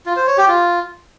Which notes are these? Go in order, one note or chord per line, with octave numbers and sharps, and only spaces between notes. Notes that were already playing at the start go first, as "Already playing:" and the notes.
F4
C5
C#5
G4
F4